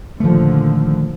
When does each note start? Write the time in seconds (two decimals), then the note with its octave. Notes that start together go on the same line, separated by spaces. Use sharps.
0.20 A#2 D3 D#3 F3 A3